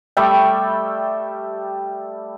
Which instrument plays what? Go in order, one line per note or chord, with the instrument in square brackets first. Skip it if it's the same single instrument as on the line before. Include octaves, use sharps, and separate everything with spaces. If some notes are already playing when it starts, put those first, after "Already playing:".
[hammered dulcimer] G3 A3 E5 G5